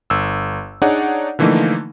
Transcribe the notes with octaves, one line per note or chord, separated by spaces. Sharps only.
G1 E6
D4 D#4 G#4 C#5 D5 F#5
D3 E3 F3 A3 A#3 D#4